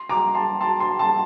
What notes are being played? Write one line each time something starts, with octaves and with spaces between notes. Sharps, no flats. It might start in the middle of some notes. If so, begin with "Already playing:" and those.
Already playing: C6
A#5 D6
A5 C6
A5 C6
A5 C6
A5 C6